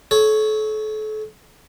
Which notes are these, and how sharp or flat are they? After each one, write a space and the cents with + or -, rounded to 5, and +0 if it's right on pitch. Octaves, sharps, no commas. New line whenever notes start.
A4 -35 C#5 +0